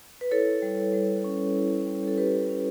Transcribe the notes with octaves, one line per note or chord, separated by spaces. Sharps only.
B4
E4 A4 C#5
G3
G3
C#4
E4
G3
A4
G3 G4 B4
C#4